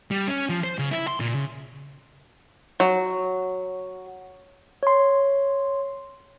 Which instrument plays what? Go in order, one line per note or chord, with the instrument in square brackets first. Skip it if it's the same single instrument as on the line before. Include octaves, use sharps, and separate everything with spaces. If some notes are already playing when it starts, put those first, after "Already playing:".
[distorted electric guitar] G3
C#4
F3
C5
C#3
E4
C6
A#2
C#3
[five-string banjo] F#3
[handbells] C#5 C6